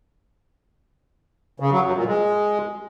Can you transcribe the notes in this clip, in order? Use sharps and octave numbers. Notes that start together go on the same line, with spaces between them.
C#3
F#3
F#2
A#2
G#3